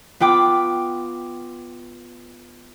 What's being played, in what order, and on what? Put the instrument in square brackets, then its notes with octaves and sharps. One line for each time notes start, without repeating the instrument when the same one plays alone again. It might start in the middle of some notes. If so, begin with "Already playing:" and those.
[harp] B3 F4 G5 D6